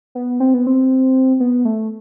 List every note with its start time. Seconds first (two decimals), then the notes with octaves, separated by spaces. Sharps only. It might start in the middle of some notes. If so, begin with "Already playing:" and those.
0.15 B3
0.40 C4
0.54 B3
0.67 C4
1.40 B3
1.65 A3